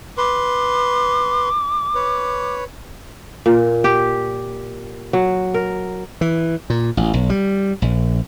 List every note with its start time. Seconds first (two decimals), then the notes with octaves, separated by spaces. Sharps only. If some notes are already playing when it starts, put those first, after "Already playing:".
0.18 B4 C6 D6
1.95 B4 C#5
3.46 A#2
3.84 G4
5.13 F#3
5.54 A#4
6.21 E3
6.70 A#2
6.97 A1
7.14 B1
7.30 G3
7.82 A#1